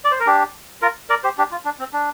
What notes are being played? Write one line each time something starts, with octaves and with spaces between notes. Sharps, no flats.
D5
C5
A#4
D4 G4
F4 A#4
A#4 D5
G4 C5
D4 G4
F4
D4
C4
D4